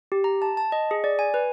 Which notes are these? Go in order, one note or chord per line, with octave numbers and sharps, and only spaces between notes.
G4
A#5
A5
A5
D#5
G#4
D5
G#5
B4